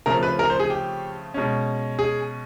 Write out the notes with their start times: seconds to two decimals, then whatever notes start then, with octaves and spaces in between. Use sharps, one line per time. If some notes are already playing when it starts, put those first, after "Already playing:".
0.06 C#3 F3 A3 C4 A#4
0.23 B4
0.39 A#4
0.50 C5
0.59 G#4
0.70 G4
1.34 B2 G#3 C#4
1.99 G#4